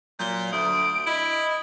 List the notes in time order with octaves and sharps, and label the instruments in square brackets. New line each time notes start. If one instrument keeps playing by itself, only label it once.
[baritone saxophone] A#2 [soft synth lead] F#3 [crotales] G6 G7
[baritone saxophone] D2 [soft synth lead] E5 [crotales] D#6 [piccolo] D7
[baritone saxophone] E4 [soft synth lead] D#5